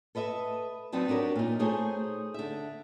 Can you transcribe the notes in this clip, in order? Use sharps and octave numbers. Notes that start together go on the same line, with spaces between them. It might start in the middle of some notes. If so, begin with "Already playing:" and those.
A4 B4 D#5 E5
F#3 B3 C4 D#4 D5 A5
D4 F#4 G4 A#4 C#5
A#2 D#4
A3 D#4 G#4 C5 C#5 G#5
D3 E5